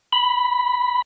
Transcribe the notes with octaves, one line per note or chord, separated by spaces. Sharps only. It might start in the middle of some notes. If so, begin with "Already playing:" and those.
B5